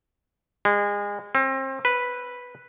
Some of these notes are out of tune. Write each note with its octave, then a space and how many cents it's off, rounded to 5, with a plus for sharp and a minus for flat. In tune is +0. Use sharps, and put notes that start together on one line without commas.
G#3 -30
C4 +35
B4 -5